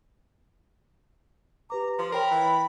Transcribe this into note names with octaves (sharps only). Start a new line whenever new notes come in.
G4 B4 A#5 D6
F3 C6
A#4 C#5 G5 B5 F7
E3 G5